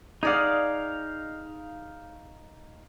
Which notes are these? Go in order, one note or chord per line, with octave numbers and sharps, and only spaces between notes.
D#4 G#4 D5 F5 F#5